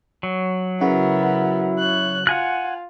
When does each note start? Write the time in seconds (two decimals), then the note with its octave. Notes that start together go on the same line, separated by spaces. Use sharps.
0.23 F#3
0.81 C#3 B3 E4 F#4 A#4
1.78 C#5 F#6
2.27 F4 F#5 G#5 F#6